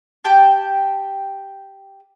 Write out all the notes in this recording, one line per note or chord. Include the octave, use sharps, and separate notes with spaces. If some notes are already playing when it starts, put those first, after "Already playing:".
G4 G5 A5